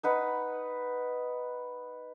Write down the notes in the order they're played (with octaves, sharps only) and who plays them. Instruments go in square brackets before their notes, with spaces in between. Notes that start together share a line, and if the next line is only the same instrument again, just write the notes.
[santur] D#4 B4 F#5